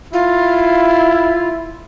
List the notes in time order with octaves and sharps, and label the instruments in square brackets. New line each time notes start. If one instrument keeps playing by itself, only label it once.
[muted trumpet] E4 [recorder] F4